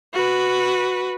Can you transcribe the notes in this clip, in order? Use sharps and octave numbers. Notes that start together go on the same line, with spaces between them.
F#4 B4